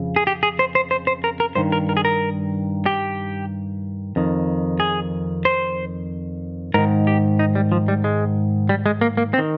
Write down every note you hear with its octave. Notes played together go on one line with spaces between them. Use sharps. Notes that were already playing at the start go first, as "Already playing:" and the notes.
Already playing: F2 C#3
G#4
G4
G#4
C5
C5
C5
C5
A#4
A#4
G2 D#3 C5
A#4
A#4
G#4
A#4
G4
F2 D#3
G#4
C5
G#2 D#3 A#4
G4
D#4
G3
F3
G3
G#3
G3
G#3
A#3
A#3
C4
D#3